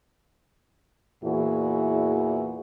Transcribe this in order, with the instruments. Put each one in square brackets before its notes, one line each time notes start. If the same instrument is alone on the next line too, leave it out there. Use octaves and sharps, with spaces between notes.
[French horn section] E2 A#2 E3 E4 F#4 G#4